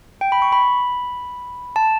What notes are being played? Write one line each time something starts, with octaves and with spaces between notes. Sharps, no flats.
G5
B5
C#6
B5
A5